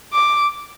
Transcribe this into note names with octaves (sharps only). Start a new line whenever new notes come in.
D6